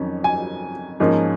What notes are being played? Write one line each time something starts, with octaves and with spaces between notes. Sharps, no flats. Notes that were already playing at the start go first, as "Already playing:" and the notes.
Already playing: F2 D#3 F#3 C#4
G#5
G#2 F3 A#3 C#4